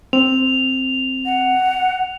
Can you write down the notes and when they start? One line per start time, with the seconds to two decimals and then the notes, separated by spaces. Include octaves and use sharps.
0.13 C4 F7
1.25 F#5